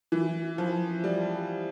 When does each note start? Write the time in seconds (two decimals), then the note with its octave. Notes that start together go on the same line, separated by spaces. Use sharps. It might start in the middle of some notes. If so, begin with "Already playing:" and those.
0.12 E3
0.58 F3
1.04 G3